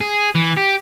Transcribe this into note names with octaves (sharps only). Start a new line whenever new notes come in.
G#4
E3
G4